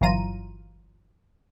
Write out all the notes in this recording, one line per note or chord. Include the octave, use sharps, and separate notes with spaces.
G1 E3 F#3 F4 A#5 D#7